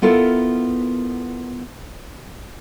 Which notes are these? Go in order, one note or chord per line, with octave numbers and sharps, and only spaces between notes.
B3 E4 F4 A4 A#4